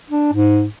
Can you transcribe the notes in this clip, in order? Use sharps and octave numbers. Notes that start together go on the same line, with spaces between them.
D4
G#2